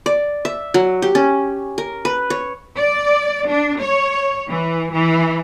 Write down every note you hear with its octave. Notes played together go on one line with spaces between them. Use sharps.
D5
E5
F#3
G4
C#4
A#4
B4
C#5
D5
D4
C#5
E3
E3